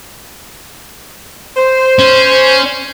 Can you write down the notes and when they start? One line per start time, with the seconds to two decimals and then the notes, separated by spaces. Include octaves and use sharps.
1.57 C5
1.99 C#4